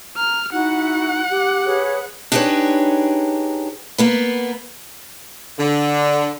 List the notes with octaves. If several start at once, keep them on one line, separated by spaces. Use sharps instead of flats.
A#5 F6
D#4 E4 F#4 F#5
G4
G#4 B4 C#5
D4 D#4 G4 G#4 B4 C#5
A#3 B3 B4
D3